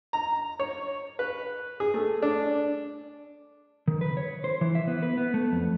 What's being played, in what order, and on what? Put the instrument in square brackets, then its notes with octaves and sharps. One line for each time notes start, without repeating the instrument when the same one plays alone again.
[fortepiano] A#5
C#5
B4
G#4
A3
D4
[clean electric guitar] D#3
B4
C#5
C5
E3
E5
B3
B4
B3
A3
F2